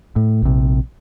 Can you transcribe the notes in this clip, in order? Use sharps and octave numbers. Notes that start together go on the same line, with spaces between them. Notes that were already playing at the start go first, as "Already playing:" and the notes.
A2
A#1 C3